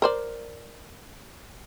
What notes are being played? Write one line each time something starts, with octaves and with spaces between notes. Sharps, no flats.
A#4 C5 D5